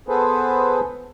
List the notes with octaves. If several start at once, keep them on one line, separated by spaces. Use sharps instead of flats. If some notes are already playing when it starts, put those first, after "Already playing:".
B3 G#4 A4 B4 C5